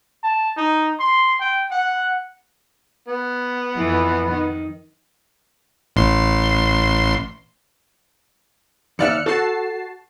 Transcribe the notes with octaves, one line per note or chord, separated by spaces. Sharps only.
A5
D#4
C6
G5
F#5
B3
F2 E3 F3
D#3
A1 C6
D#2 D5 E5 F6 F#6 C#7
F#4 A4 A5 C7